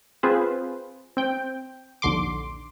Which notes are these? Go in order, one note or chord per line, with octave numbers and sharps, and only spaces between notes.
C4 F4 G#4 B4 C5
C4 G5
A#1 D#2 D3 C6 D6